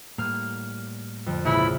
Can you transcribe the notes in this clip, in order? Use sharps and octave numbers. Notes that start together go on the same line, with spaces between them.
A2 G3 A#3 F6
F2 D3
A#1 G#2 C#3 E3 E4 G#4